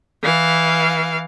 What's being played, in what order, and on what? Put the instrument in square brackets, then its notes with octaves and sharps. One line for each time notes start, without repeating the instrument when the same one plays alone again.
[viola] E3 F5